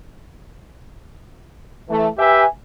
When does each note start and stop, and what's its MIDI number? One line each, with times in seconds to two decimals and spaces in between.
1.90 2.08 52
1.90 2.08 57
2.19 2.46 67
2.19 2.46 71
2.19 2.46 76
2.19 2.46 80